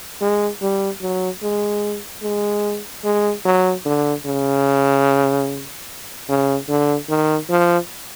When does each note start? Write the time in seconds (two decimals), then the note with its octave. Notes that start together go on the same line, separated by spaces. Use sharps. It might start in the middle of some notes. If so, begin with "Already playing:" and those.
0.21 G#3
0.62 G3
1.01 F#3
1.42 G#3
2.23 G#3
3.04 G#3
3.45 F#3
3.86 D3
4.25 C#3
6.29 C#3
6.69 D3
7.09 D#3
7.50 F3